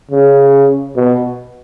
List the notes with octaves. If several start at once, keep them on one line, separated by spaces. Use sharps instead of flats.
C#3
B2